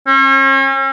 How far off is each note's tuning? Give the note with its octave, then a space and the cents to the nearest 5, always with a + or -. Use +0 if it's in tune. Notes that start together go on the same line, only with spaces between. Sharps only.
C#4 -40